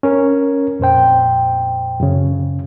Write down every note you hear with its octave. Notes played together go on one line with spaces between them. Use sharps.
C#4 A#4
F2 A#2 C5 G5
F#2 C#3